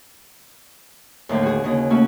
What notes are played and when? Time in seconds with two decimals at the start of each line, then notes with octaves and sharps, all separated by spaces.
1.29 D#2 A2 D3 F3
1.43 F#4 G#4
1.64 D#2 C#3 G#4
1.90 A3 A#3 C#4 E4 F#4